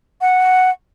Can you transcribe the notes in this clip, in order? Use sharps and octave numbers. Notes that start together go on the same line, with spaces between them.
F#5